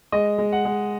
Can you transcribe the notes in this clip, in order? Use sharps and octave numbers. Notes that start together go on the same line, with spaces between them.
G#3 D#5
G#3
F#5
G#3